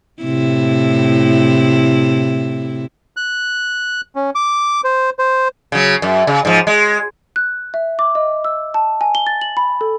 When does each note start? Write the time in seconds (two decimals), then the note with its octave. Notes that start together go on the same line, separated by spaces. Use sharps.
0.23 A2 C3 E4
3.17 F#6
4.16 C#4
4.35 D6
4.84 C5
5.19 C5
5.72 C#3 F#3
6.02 F#2
6.27 C#3
6.45 G#2 F3
6.67 G#3
7.36 F#6
7.74 E5
7.99 D6
8.15 D#5
8.44 E6
8.74 A5
9.01 G#5
9.15 G7
9.27 A6
9.41 F#7
9.57 B5
9.81 A4